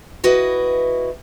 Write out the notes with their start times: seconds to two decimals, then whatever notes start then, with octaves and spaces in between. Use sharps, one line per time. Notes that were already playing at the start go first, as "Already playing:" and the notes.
0.24 E4 F#4 B4 D#5